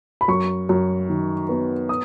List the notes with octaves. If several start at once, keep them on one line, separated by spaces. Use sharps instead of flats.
B5
F#2 C#6
F#2
D#3
B3
D#6